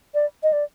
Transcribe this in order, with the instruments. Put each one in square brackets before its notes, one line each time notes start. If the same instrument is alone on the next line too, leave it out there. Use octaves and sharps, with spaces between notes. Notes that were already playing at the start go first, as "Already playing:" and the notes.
[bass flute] D5
D#5
D5